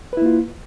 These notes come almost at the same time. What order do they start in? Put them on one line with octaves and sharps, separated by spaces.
B4 E4 A#3 F4